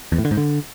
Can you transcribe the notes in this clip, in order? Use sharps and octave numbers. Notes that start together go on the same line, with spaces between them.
E2
A2
D3
G#2
D3